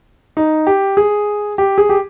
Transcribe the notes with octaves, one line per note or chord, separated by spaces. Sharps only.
D#4
G4
G#4
G4
G#4
G4